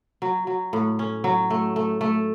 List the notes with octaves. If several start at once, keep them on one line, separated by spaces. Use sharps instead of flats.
F#3
F#3
A2
C#4
F#3
A3
A3
A3